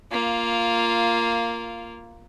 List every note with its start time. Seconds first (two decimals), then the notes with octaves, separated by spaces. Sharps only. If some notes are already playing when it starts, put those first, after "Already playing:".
0.11 A#3 F4